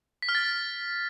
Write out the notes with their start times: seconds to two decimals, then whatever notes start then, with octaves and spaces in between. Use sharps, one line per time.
0.22 B6
0.29 F6
0.35 A6